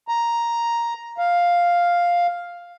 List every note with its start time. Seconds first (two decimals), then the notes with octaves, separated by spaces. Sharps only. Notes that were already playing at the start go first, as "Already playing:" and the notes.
0.08 A#5
1.18 F5